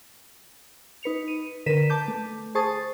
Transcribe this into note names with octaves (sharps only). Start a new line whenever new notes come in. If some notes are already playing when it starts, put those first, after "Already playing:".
D#4 B4 C#7 F7
D#7
D3 A#4 B4 B6 D#7 E7
A5 D6 G6
A3
G#4 C5 A5 C#6 D#6 A6